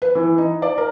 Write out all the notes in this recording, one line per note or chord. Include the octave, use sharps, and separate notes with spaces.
B4
E3
D#4
D5
A#4